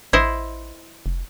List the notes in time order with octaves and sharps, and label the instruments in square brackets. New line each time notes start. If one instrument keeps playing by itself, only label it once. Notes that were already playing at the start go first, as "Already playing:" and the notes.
[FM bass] A1 [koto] E4 C5 D#5
[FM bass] F1